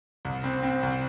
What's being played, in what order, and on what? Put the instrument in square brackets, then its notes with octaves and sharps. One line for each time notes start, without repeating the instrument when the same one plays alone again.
[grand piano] C2
C4
C4
C2